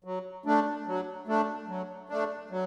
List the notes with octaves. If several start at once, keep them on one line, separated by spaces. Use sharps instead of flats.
F#3
A3 D4
F#3
A3 D4
F#3
A3 D4
F#3